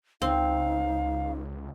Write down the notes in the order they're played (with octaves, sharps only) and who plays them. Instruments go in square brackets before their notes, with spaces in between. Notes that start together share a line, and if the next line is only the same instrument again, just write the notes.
[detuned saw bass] C#2 [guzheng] C4 [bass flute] D#4 [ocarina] F5